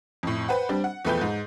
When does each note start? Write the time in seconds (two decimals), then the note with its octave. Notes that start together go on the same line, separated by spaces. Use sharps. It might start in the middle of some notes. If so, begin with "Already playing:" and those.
0.23 F2 A2
0.48 B4 C5 F#5 G5
0.69 G3 C4 D4
0.84 F#5
1.05 E2 F3 A3 B4 G5 G6
1.21 G#2